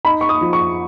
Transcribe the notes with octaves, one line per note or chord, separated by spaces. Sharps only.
D#4 B5
C#6
D#6
F3
C#6